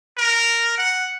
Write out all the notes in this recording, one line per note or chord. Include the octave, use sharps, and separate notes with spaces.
A#4
F#5